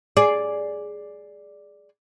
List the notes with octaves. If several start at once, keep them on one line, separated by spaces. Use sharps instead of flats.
G#4 D5